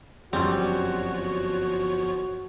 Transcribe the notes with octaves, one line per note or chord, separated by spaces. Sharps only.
G1 F#2 F3 G3 C4 F#4 C#5